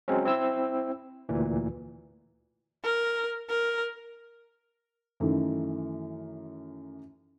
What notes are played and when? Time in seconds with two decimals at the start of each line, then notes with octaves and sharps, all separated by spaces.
0.08 F#3 G#3 C4 C#4
0.25 C4 E4 E6
1.29 D2 A#2 E3
2.84 A#4
3.50 A#4
5.20 F#2 D#3 E3 A3